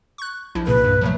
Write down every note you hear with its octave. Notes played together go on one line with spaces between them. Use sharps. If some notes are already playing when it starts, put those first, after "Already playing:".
C#6 F#6
A#1 F3 E4
C2 A#2 C#3 B4
G2
F3 F#3 A3